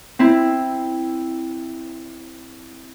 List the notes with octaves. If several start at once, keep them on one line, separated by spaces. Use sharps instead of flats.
C4 E4